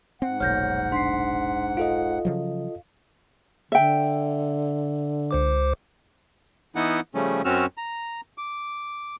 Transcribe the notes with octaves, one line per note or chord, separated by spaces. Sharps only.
G#2 C4 F#5
F1 B1 A#2 C#5 F6 G6 A#6
D4 C6 B6 C7
F4 A4 D#5 F5
C#3 F3 F#3
D3 E5 G5
C#2 C5 D6
E3 B3 D#4 E4 F#5
C#3 F3 G3 A3 C#4
F#2 C4 C#4 F#4 E6 F6
A#5
D6